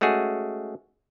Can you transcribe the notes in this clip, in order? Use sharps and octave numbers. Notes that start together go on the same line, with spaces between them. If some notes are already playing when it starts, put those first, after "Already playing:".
G#3 A3 C#4 F#4 G#4